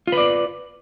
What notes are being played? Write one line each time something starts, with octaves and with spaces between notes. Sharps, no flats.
F4 B4 D5